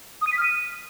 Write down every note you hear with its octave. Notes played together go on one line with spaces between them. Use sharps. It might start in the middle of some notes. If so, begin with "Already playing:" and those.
D#6
D#7
B6
F6
D#7